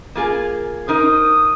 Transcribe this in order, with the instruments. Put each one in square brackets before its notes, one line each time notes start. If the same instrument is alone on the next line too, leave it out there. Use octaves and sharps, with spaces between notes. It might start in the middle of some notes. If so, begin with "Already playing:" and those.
[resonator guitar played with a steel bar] A#3 F4 G#4
[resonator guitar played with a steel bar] D#4 A#4 C5 [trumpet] D#6